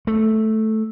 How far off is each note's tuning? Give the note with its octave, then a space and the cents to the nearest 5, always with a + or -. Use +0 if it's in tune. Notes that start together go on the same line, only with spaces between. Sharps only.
A3 -5